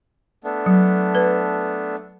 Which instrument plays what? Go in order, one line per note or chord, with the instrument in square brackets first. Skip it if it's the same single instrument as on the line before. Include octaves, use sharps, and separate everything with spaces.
[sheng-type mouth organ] A3 B3 D4
[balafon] F#3
B4